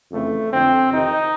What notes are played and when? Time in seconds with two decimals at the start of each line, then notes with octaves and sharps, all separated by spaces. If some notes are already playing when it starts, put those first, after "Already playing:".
0.12 F2 C#3 E3 A3
0.50 F2 D3 C4
0.90 F2 C3 D#3 D#4